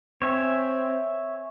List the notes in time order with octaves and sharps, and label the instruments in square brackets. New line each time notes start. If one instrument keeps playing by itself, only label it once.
[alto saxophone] C4 [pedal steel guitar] C#5 E5 G#5